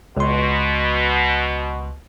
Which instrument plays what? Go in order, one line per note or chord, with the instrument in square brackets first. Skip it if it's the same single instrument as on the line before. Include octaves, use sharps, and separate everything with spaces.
[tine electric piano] C#2 C6 [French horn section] B2